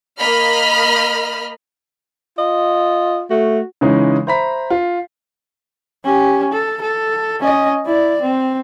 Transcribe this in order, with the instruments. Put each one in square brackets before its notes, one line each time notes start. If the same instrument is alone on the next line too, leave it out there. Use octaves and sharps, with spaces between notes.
[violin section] A#3 D#5 B5 F6
[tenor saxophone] F4 [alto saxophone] D#5
[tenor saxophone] A3 [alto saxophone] F#4
[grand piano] C#3 E3 G#3 C#4 D#4
C5 E5 A#5 B5 B6
F4
[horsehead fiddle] C#4 G4
A4
A4
C#4 D#5
E4 D5
C4